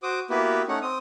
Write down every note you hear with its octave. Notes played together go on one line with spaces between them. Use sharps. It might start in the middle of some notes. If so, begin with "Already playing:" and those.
F#4 C5 D6 D#6
A#3 B3 E4 F#4 G4 B4
A3 C#4 D#4 F#5
C4 D#6